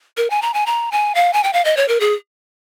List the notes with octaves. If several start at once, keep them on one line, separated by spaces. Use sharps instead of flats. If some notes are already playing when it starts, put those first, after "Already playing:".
A#4
G#5
A#5
G#5
A#5
G#5
F5
G#5
G5
F5
D#5
C#5
A#4
G#4